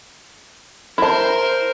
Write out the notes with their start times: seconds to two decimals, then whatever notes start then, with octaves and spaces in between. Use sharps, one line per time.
0.98 E4 A#4 C5 A5